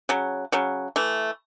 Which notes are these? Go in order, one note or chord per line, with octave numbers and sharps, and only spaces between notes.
C#3 F#3
C#3 F#3
E3 A3